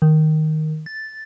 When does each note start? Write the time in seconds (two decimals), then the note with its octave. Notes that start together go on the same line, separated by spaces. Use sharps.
0.02 D#3
0.86 A6